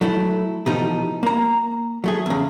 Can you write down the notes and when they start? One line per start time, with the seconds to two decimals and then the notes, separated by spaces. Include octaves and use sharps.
0.01 F#3 A3 E4
0.66 B2 E3 F3 A3 D#4 G4
1.23 A#3 A#5
2.04 F#3 A3 G#4
2.26 E2 C#3